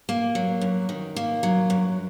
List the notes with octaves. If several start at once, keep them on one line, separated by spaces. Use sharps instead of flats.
A#3
F#3
F#2
D#3
A#3
F#3
F#2